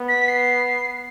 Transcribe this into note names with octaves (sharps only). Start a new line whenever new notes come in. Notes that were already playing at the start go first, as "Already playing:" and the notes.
Already playing: B3
B6
C7